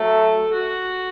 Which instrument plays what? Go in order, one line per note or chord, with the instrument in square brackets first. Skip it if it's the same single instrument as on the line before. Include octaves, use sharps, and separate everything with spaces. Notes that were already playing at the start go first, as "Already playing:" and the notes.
Already playing: [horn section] F#3 A3 [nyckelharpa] A4
[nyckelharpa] F#4